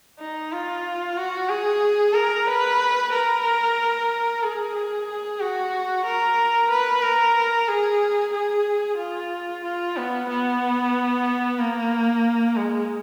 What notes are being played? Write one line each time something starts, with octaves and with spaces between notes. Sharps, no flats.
D#4
F4
F#4
G#4
A#4
B4
A#4
G#4
G#4
F#4
A#4
B4
A#4
G#4
G#4
F4
F4
B3
B3
A#3
G#3